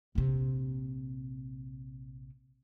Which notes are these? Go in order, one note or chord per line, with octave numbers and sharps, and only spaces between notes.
A#1 C3